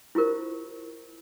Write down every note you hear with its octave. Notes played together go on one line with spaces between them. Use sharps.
E4 F4 G4 A#4 C5